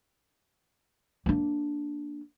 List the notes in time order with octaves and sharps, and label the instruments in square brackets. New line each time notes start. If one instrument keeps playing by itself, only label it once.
[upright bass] A#3 D4